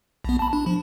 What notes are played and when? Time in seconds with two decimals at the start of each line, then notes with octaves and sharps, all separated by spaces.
0.24 A#1 B3
0.39 A5 B5
0.53 D4
0.66 F3